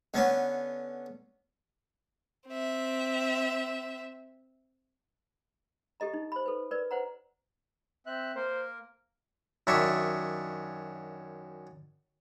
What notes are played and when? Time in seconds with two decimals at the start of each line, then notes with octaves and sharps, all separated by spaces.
0.14 D3 B3 C#4
2.48 C4 E5
6.00 G4 A4 D#5 A#5
6.14 D#4
6.32 C5 B5
6.46 A4 B4
6.71 A#4 B4 D5
6.91 B4 C5 F#5 A#5
8.06 C4 E5 F#6
8.36 A#3 A#4 C5
9.67 F#2 D#3 D4 E5 C#6